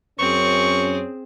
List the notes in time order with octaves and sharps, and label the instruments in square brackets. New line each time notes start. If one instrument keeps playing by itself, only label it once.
[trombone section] F#2 [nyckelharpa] C4 G#4 [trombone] C#4 [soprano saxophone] C#6